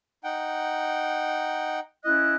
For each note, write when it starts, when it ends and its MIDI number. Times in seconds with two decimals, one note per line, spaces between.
0.24 1.79 63
0.24 1.79 78
0.24 1.79 79
2.04 2.34 61
2.04 2.34 64
2.04 2.36 75
2.04 2.34 90